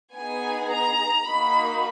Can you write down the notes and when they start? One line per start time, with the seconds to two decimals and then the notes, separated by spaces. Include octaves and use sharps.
0.15 B3 D#4 G#4 G#5
0.70 A#5
1.27 A#3 D#4 F#4 B5